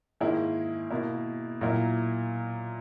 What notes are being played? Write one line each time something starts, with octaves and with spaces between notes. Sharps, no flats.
G#2 D#3 A#3 E4 G#4
B2 A#3 E4
A#2 F#3 A#3 E4 A#4